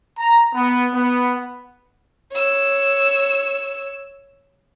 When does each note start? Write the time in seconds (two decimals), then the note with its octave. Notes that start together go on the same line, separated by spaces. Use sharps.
0.18 A#5
0.54 B3
0.93 B3
2.33 C#5 E6